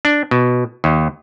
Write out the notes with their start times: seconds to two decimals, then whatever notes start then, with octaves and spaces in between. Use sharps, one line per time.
0.05 D4
0.31 B2
0.84 D#2